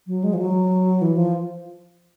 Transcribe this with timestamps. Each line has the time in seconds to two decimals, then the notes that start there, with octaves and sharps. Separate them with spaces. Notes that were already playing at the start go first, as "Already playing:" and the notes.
0.07 F#3
0.24 G#3
0.33 F3
0.39 F#3
1.02 E3
1.17 F3